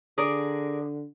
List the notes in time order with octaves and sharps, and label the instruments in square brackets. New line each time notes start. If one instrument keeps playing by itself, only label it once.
[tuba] D3 [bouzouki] G#4 A#4 D5